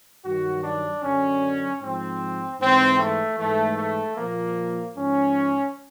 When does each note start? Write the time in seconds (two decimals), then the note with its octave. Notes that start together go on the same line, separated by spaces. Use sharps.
0.24 G2 D#3 F#3 F#4
0.64 D4
1.03 F#2 D3 F#3 C#4
1.81 G#2 F3 C4
2.60 G#2 E3 C4
2.99 A3
3.38 G#2 E3 A3
3.78 A3
4.17 A#2 F3 A#3
4.96 G#2 F3 C#4